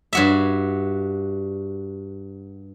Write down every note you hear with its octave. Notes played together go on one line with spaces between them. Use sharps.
G2 F#4 E5